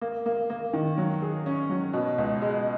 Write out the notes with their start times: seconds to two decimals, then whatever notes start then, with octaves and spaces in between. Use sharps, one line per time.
0.01 A#3
0.26 A#3
0.50 A#3
0.73 D#3
0.98 F#3
1.22 G#4
1.46 C#4
1.70 F#3
1.93 B2
2.18 C#2
2.42 G#3